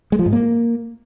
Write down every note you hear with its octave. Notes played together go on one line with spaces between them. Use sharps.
G#3
F3
G#2
A#3